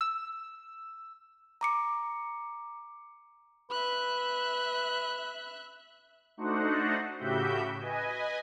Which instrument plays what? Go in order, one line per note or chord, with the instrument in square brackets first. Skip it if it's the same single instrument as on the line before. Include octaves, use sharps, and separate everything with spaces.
[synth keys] E6
[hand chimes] A#5 D6 C#7
[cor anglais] B4 [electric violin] E5 F#6
[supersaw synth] A3 D4 D#4 F#4 C5 F#5
A2 C#3 F#4 G4 E5 G6
B4 D#5 G#5